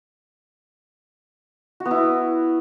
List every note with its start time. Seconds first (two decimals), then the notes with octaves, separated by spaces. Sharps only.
1.80 F#4
1.85 B3
1.91 E4